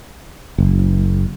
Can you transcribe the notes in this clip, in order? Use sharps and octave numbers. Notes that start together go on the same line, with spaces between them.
F#1